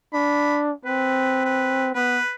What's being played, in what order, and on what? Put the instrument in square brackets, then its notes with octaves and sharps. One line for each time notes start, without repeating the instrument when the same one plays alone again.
[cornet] D4 [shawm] B5
[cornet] C4 [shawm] B4
[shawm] B4
[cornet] B3 [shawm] B4